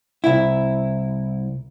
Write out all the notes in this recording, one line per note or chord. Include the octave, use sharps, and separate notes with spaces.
C2 E4